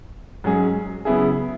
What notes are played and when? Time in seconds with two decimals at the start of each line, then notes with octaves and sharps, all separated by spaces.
0.44 G#2 F#3 C#4 G#4
1.05 C#3 F#3 B3 E4 G#4